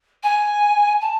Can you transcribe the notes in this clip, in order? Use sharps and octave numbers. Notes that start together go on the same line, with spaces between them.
G#5
A5